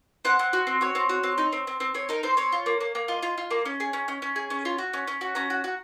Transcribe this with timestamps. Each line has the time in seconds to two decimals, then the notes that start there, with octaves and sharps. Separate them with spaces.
0.25 C4 F#5
0.39 C4
0.53 F#4
0.67 C4
0.81 F#4 C#5
0.95 C4
1.09 F#4
1.23 C4
1.38 D#4
1.52 C4
1.67 C4
1.80 C4
1.95 C4 C#5
2.09 D#4 A#4
2.23 C4 C5
2.37 C4 C#5
2.52 F4
2.66 A#3
2.81 A#3
2.95 A#3
3.08 F4 D#5
3.23 F4
3.38 F4
3.51 A#3
3.65 C#4
3.80 G#4
3.93 C#4
4.08 C#4
4.22 C#4
4.36 G#4
4.50 C#4
4.65 F4
4.78 F#4
4.93 C#4
5.08 C#4
5.21 F#4
5.35 C#4 A#5
5.50 F#4
5.64 F#4